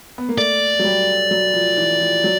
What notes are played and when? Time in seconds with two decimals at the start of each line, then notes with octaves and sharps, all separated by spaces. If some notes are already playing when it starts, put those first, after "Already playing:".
0.18 B3
0.29 A#3
0.38 A3 D5
0.79 F#3
0.84 G3
1.31 F#3
1.54 F3
1.77 E3
2.00 F3
2.24 F#3